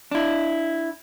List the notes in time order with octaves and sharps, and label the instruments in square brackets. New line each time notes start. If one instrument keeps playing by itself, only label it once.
[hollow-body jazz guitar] D4 E4